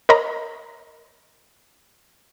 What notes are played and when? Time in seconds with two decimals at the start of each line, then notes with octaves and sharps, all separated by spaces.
0.09 A#4 C#5 D#5 A#5 B5